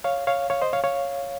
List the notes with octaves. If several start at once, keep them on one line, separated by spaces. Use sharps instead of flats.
C#5 F5
C#5 F5
C#5 F5
C5 D#5
C#5 F5
C#5 F5